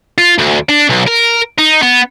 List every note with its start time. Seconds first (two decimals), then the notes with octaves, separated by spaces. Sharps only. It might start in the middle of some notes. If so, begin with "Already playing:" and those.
0.18 F4
0.38 D2
0.69 D4
0.90 B1
1.08 A#4
1.58 D#4
1.83 B3